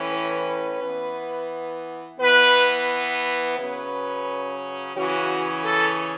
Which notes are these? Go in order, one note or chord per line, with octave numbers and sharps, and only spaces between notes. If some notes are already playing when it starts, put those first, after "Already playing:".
Already playing: A2 E3 C#4
B4
E3 B3
E3 B3 B4
C#3 F#3 C#4 B4
C#3 E3 C#4 F#4
A4